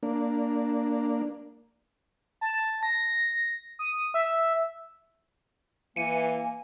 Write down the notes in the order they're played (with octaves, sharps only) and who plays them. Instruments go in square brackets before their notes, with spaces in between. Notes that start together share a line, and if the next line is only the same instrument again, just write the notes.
[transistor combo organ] A#3 D4
[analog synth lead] A5
A#6
D#6
E5
[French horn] E3 [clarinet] A#3 [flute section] G#5 [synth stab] C#7 D#7